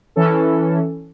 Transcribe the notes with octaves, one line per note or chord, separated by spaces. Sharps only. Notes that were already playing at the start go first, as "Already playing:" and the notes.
E3 C#4 A4